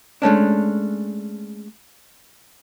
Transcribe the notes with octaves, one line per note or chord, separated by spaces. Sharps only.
G#3 A3 C#4 D4